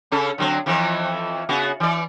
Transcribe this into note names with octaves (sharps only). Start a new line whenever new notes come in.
C#3 C#4 A4
D3 F#3 C4
F2 E3 F3
C#3 B3 F#4
E3 D5